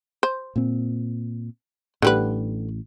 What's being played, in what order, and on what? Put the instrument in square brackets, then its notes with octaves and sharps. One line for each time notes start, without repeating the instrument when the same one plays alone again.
[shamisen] C5
[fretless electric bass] A#2 C4
[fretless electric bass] A1 A2 [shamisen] D3 G3 B4